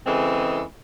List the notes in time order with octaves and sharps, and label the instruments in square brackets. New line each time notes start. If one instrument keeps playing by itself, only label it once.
[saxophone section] C#3 E3 G#3 C4 A4